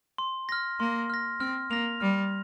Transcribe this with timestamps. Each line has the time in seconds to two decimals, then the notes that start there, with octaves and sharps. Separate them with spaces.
0.18 C6
0.49 F6 A#6
0.80 A#3 C6
1.10 F6 A#6
1.40 C4 F6
1.70 A#3 A#6 F7
2.00 G3 F6